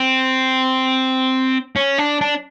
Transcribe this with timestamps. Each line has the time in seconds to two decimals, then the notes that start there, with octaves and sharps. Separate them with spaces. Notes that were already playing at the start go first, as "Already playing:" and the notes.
Already playing: C4
1.76 C#4
1.98 D4
2.21 D4